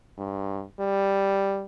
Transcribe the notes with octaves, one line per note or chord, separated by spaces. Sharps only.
G2
G3